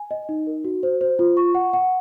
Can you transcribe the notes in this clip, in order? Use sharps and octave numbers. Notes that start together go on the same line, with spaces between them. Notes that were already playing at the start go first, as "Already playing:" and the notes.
Already playing: G#5
D#5
D#4
A#4
F#4
C5
C5
F4
C#6
F#5
F#5